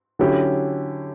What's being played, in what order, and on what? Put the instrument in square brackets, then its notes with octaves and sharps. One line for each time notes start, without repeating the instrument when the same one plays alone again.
[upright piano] D3 F#3 C#4 E4 G4